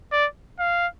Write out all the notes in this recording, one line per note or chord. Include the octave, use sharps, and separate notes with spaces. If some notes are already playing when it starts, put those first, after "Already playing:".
D5
F5